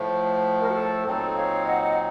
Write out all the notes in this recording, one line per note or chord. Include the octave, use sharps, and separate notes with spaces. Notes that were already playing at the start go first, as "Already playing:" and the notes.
Already playing: A2 F3 A3
A#4
F#4
A4
A#2 F#3 C4 D#4 A4
C#5 F5
D#5 F#5
D#5 F#5